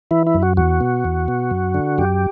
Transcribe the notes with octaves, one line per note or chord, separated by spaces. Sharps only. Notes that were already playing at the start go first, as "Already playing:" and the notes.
E3 E4
E4
F#2
F#4
E2 F#4
B2
E2
B2
F#2
D3
F#2 G4